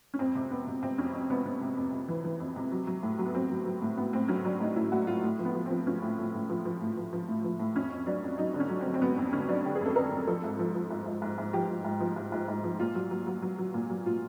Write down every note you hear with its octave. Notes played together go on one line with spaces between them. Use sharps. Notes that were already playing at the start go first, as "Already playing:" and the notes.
C#4
F2 C4
C3
F2 B3
C3
C3 C4
F2 C#4
F2
C3 B3
C3 B3
C3
F2
C3
E3
E3
F2
C3
F#3
F#3
A2
F#3
B3
F#3 C4
F#3
F#3
A2
A2 B3
A2 C4
F#3 C#4
F#3 D4
A2 D#4
A2 E4
A2 F#4
A2 F4
A2
F3
B3
F3
F3 C4
F3 C#4
A2
A2
A2
F3
F3
A2
F3
F3
A2
F3
A2
F2 C#4
F2
F#3 D4
F2
F#3 D#4
D3
C#4
F#3
C4
F#3
C4
F#3 B3
F2
D3 C#4
F#3 D4
D3 G4
G#4
F2 A4
F2 A#4
F2
F3 A4
G#2
F3
F3
G#2
G#2
G#2
G#2
F3 G4
F3
G#2
F3
G#2
G#2
G#2
F3
A#2 F4
F#3
F#3
F#3
F#3
F#3
A#2
F#3
A#2 F4